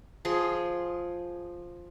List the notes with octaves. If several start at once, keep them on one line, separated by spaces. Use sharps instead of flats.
F3 G#4 C6